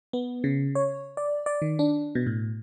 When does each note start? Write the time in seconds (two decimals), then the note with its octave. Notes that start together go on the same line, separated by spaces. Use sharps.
0.13 B3
0.44 C#3
0.75 C#5
1.17 D5
1.46 D5
1.62 D#3
1.79 D4
2.15 B2
2.27 A2